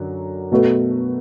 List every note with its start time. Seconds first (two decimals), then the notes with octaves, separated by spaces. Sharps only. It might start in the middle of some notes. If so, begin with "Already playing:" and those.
Already playing: F#2 D3 F#3 D4
0.52 B2 A3 F#4 B4